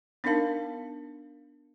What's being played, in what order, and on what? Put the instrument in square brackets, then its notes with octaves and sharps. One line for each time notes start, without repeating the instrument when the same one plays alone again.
[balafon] B3 D4 D#4 A#4 F5 A5